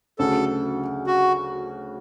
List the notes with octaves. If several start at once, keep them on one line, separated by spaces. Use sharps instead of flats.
D2 C#3 F#3 C#4 G#4 A4
F#4